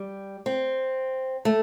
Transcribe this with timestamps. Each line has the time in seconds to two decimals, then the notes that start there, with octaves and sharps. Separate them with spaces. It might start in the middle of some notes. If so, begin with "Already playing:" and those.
Already playing: G3
0.46 C4
1.45 A3